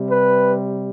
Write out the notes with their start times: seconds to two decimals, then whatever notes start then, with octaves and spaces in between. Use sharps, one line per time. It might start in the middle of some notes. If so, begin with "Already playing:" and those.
Already playing: C3 G3
0.09 B4